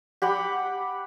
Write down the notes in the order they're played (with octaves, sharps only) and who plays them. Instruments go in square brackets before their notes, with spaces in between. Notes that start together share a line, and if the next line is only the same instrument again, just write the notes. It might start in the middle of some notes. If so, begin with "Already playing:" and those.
[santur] G4 F#5 B5 D6